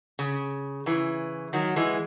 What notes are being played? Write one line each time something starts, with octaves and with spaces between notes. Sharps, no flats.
C#3
C#3 E3
D#3 F#3
E3 G#3